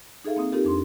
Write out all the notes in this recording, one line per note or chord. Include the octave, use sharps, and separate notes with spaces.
D#4 G#4 A4 E5 F5
A#3 C4 D#6
C4 D#4 F4 G4 A4 A#4
F2 D4 C6